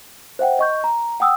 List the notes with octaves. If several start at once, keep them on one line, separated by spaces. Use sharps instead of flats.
C5 E5 F#5 G5
D#5 C#6 G6
A#5
F#5 G5 D#6 E6